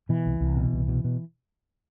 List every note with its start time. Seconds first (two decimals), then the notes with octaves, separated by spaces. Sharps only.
0.09 B2 E3
0.26 C2
0.40 C2
0.57 B2
0.73 C2
0.88 B2
1.04 B2